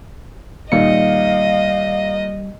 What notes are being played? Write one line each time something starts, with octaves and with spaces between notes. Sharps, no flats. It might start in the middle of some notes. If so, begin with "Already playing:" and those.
A#2 D#3 G3 D#4 D#5 F5 C#7